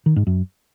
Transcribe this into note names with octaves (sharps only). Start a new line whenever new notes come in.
D#3
G#2
F#2